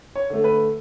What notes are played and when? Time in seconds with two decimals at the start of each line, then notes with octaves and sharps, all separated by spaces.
0.16 C#5
0.30 D3 A3
0.44 B4